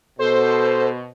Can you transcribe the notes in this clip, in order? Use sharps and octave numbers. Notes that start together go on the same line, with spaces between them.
B2 A4 C5